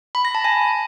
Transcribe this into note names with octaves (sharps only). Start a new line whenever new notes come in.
B5
A#6
A5
G#5